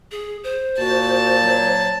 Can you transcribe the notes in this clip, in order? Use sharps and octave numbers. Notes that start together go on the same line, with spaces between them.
G#4
C5
A#2 F#4 A5
F#3